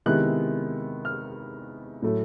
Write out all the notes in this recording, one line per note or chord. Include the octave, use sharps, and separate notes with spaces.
C3 D#3 G#3 B3 E4 F#6
F6
A2 F#3 A3